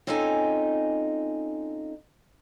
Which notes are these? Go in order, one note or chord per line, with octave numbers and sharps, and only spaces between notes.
C4 C#4 D#4 F4 A4 G#5